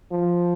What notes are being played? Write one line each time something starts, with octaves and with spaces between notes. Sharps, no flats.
F3